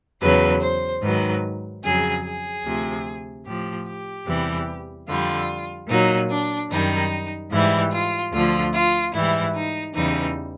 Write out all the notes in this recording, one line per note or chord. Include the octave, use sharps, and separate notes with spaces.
E2 C#3 F#3 B4
C5
G#2 D#3 F#3 B4
F2 C#3 F#3 G#4
G#4
D2 C3 F3
A2 F3 G4
G4
E2 C3 E3 G3
F2 D3 G3 F4
A#2 F#3 D#4
D4
F#2 D#3 G3 D#4
G#2 E3 G3 E4
F4
D2 D3 F3 F4
F4
G#2 E3 G3 E4
D#4
E2 C#3 E3 G3 D#4